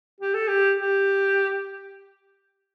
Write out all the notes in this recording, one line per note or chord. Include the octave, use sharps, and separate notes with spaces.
G4
A4
G4
G4